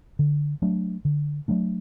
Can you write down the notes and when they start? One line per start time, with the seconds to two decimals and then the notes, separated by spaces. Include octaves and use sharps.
0.19 D3
0.62 F#3 A3 D4
1.05 D3
1.48 F#3 A3 D4